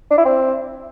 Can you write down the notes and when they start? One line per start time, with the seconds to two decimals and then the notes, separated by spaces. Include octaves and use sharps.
0.11 D4
0.18 E4
0.25 C4